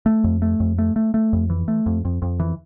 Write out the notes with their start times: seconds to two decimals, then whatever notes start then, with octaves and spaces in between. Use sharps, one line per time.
0.06 A3
0.24 F2
0.42 A3
0.60 F2
0.78 A3
0.96 A3
1.14 A3
1.33 F2
1.50 E3
1.68 A3
1.86 F2
2.05 F2
2.22 F2
2.40 E3